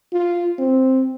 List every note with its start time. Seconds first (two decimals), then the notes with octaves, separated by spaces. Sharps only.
0.13 F4
0.59 C4